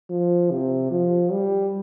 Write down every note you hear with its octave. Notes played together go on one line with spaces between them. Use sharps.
F3
C3
F3
G3